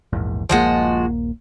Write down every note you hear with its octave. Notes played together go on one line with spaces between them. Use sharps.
A#1 E2 G#2
D#1 A#1 F3 G#3 A#3 F#4